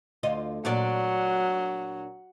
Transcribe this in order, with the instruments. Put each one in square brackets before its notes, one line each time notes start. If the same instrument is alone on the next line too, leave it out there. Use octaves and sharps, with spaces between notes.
[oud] D2 F4 D#5
[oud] A#2 D4 D5 [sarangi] F#3